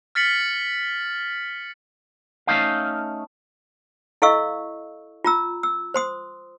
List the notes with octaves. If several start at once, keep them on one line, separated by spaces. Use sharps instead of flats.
F6 A6 B6 C#7 F#7
A3 C#4 D#4 F5
E4 A4 D#5 F5 C#6 E6
F4 A#5 E6
E6
C5 C6 D#6